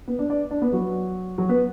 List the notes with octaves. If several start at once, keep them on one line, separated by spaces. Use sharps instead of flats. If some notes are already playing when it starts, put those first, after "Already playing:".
B3 B4
D4 D5
D4 D5
D4 D5
B3 B4
F#3 F#4
F#3 F#4
B3 B4